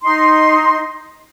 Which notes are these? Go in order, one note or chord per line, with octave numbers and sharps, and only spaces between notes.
D#4 C6